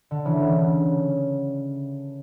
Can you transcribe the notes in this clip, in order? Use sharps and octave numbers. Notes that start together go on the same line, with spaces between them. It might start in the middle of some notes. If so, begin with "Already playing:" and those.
D3
C#3 E3
D3
C#3